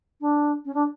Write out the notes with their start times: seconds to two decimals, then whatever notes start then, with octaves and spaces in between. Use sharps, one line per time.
0.21 D4
0.65 C#4
0.74 D4